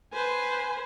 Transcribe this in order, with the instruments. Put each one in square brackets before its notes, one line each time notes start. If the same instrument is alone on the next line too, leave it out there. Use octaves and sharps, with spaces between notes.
[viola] B4 C5 [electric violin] G#5